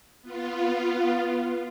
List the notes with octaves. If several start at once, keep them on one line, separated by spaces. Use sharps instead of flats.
B3 F4